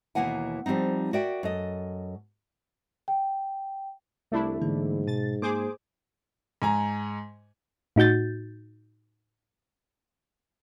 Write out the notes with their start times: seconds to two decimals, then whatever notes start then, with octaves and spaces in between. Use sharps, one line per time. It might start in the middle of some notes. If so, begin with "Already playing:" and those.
0.15 D#2 B2 E3 A#3 F#5 G#5
0.66 F3 G3 G#3 C4 D#4
1.13 F#4 A#4 D5 E5 G5
1.43 F#2 A4 D#5
3.08 G5
4.32 C2 A3 D4 E4
4.62 G#2 D3 E3 A#3
5.07 B2 A6
5.42 A#3 G#4 C5 D6
6.62 G#2 G#5 A#5
7.96 A2 D#4 F#4 G6 A6